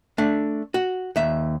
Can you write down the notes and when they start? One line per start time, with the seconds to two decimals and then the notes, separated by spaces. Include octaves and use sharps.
0.18 A3 D4
0.74 F#4
1.16 D#2 E5